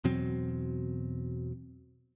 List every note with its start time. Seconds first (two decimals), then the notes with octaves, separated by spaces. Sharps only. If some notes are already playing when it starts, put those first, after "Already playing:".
0.04 E2 B2 F#3 C4